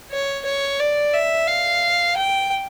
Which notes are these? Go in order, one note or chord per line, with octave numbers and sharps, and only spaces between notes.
C#5
C#5
D5
E5
F5
G5